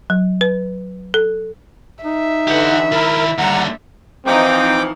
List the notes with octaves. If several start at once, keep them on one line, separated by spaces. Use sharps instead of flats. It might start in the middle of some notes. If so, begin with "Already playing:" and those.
F#3
B4
A4
D#4 E5
D3 E3 G4 F#5
D#3 E4 A#4
D#2 D3 G3 F#5 A#5
E3 F3 C4 D#4 G5 D6